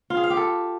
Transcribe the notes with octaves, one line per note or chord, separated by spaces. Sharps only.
F4
G#4
F5
G4
A4